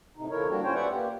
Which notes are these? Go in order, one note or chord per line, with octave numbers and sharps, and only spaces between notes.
A2 C3 D#4
D3 F3 E4 A#4 C#5
G3 A#3 D4 F#4 G4
A2 C#4 F4 C5 C#5 G5
G4 B4 D5 E5 F#5
A#3 G4